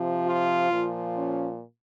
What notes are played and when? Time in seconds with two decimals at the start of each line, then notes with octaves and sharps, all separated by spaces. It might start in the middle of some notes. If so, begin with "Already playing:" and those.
Already playing: C3 F3
0.27 F4
0.72 A#2 F3
1.16 C#4